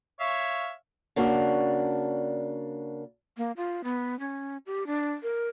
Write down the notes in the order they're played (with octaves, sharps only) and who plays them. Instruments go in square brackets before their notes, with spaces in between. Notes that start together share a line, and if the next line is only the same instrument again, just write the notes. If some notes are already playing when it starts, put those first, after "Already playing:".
[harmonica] C#5 E5 F5
[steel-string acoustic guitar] C#3 A#3 D4 F#4
[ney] A#3
F4
B3
C#4
G4
D4
A#4